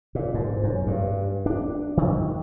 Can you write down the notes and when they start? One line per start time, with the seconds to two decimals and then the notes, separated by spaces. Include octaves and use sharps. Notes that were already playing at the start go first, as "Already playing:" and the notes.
0.15 A#2
0.34 G#2
0.63 F#2
0.87 G2
1.46 D4
1.97 D#3